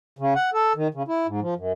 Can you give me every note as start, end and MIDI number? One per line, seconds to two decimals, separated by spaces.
0.19 0.34 49
0.36 0.50 78
0.53 0.73 69
0.76 0.88 51
0.94 1.03 49
1.08 1.27 64
1.27 1.40 44
1.41 1.54 53
1.56 1.72 42